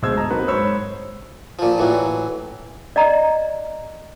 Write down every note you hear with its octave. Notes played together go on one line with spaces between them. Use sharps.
D2 B2 G#3 C5 E6 G#6
D#5 A5 A#5 D#6
F#3 A#3 C4 D#4 F#4 B4
G#2 C5 C#5 B5 E6
A#2 F3
A2 E3 F#3
D5 D#5 A#5